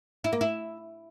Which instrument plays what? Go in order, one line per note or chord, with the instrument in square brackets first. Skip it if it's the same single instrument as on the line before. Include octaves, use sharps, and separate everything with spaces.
[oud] E4
A#3
E4